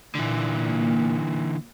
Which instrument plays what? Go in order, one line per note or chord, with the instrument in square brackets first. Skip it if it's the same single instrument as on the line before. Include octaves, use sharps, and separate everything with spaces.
[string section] A#2 [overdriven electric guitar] D3 E3